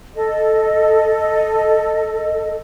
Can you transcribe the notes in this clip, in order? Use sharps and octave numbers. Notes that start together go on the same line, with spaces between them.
A4 D#5